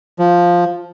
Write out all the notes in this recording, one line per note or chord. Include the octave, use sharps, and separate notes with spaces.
F3